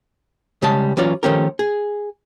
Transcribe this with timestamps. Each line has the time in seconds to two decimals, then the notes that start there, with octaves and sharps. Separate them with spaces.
0.62 C#3 G3 G#3 A5
0.97 E3 F#3 C#4 F4 D5
1.23 D#3 F3 A3 C#4 G4 A#4
1.59 G#4